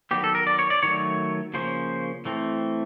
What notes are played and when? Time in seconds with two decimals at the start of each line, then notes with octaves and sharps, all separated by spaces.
0.11 D#3 F#3 B3 G4
0.24 A4
0.35 A#4
0.47 D5
0.59 C#5
0.70 D5
0.83 D#3 F#3 A3 C#5
1.54 C#3 F3 A#3 C#4 C5
2.25 E3 A3 C4